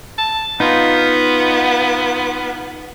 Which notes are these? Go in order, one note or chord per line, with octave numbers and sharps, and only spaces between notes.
A5
B3 D#4 F4